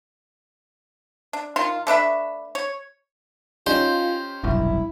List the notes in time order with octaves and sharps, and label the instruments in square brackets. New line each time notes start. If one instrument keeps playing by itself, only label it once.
[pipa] D4
D#3 F4 C6
A3 D4 B4 E5
C#5
[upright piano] C#4 D#4 G4 [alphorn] F4 [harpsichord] C5
[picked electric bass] F1 B1 G2 [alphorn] E4